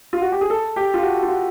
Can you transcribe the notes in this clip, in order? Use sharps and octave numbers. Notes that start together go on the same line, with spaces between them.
F4
F#4
G4
G#4
A4
G4
F4
F#4
F4
F#4